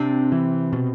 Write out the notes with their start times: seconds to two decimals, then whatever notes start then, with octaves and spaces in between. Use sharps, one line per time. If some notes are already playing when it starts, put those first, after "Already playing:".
Already playing: C3 C4 D4
0.32 E3
0.73 B2